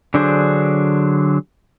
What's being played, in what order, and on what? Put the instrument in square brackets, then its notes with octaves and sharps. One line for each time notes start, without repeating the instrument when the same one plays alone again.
[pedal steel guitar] D3 F#3 D4 G#4 C5